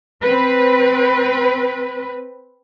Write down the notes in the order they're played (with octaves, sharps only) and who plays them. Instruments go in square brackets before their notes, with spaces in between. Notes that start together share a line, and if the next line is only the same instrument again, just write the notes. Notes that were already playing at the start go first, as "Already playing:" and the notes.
[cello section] C4 B4